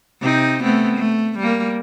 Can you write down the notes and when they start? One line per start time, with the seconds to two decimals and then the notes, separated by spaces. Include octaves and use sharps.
0.21 C3 C4 D#4
0.64 A3 B3 C4
0.98 A3
1.39 G3 A#3